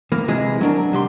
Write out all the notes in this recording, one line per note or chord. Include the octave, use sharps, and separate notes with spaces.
E3 A#3
C3 E3 G#3 E4 G#4
F#3 D4 A#4
C2 F#3 G4 C6